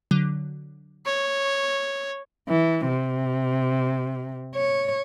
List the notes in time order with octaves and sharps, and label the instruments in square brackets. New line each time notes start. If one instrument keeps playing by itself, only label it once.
[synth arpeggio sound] D3 F#3
[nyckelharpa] C#5
[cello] E3
C3
C#5